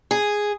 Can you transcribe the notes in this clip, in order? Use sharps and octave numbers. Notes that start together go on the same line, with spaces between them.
G#4